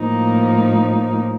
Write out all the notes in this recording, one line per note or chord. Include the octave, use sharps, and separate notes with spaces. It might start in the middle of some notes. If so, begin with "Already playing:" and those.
Already playing: A2 F3 A#3 D#4